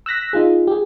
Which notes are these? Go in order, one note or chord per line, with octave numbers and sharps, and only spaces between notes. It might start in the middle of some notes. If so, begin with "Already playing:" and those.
E6 F#6 A#6 B6
D#4 F4 G#4
G4 G#4